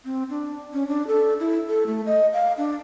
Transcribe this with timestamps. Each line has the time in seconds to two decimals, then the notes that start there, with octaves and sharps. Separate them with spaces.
0.05 C4
0.30 D4
0.74 C#4
0.88 D4
1.07 A4
1.40 E4
1.68 A4
1.87 A3
2.06 D#5
2.33 F5
2.57 D4